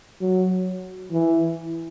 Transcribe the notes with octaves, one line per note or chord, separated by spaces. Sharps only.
F#3
E3